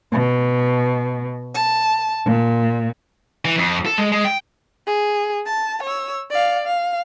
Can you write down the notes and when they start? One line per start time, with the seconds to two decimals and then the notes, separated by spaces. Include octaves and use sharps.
0.11 B2
1.53 A5
2.25 A#2
3.45 E3
3.58 F2
3.86 A4
3.98 G#3
4.12 G#3
4.25 G5
4.87 G#4
5.46 A5
5.83 C#5 E6
6.31 D5 F5
6.66 F5